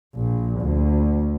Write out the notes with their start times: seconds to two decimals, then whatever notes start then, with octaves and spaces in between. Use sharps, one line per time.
0.15 A#1
0.60 D2